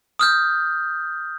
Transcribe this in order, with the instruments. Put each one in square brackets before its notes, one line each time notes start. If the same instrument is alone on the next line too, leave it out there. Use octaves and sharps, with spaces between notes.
[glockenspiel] D#6 F6 G6